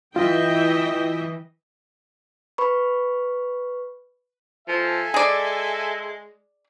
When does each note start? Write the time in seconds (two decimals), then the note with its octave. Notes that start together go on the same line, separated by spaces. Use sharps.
0.16 E3 F4 D#5 E5 G5
2.58 B4 B5 C#6
4.68 F3 A4 E5 G#5
5.14 G#3 G#4 D5